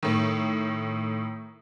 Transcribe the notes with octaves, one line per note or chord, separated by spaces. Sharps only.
A2 D#3